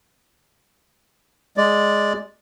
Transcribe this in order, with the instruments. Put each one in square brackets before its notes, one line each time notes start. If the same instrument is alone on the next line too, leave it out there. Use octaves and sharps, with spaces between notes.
[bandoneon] G#3 D5